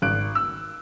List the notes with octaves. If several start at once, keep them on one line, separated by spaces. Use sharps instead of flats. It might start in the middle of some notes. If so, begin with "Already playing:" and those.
G#1 F#6 D7
E6